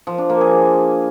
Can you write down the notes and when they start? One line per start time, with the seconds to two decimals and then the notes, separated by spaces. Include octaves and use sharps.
0.07 F3
0.18 D4
0.30 A#3
0.41 G#4